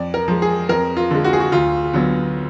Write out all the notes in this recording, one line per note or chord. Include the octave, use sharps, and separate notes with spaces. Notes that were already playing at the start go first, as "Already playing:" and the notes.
Already playing: F2 D5
A#4
F3 G#3
G#4
F2 A#4
F4
D3 G#3
F#4
G#4
F#4
D2 F4
D3 F#3 B3